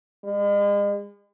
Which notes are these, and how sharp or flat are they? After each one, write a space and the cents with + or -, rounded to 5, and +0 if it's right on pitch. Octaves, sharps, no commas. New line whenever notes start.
G#3 -40